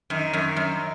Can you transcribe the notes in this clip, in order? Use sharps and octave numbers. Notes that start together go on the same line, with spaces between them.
F#2 D#3
F#2
F#2